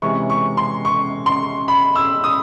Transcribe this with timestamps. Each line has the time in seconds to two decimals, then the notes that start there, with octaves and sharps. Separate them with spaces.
0.02 C3 E3 G#3 C#4 C#6
0.30 C#6
0.57 C6
0.85 C#6
1.26 C6
1.68 B5
1.96 E6
2.24 D#6